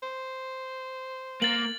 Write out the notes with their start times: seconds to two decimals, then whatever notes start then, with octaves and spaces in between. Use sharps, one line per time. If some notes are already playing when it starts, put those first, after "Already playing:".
0.03 C5
1.42 A#3 A6 F#7